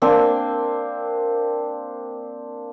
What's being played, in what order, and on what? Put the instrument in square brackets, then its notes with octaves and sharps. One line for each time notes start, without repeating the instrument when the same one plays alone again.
[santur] A#3 C4 D4